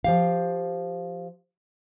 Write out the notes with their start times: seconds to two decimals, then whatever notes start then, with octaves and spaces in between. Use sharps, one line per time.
0.04 F3 G4 F5